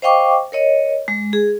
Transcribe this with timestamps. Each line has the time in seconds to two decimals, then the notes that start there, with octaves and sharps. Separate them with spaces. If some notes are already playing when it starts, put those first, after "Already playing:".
0.02 C5 D#5 F5 G5 C#6 D6
0.52 A#4 C#5 D#5
1.08 G#3
1.33 G#4